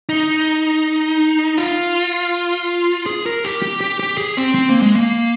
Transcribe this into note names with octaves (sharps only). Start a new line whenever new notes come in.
D#4
F4
G#4
A#4
G4
G4
G4
G4
G#4
C4
C4
A#3
G#3
A#3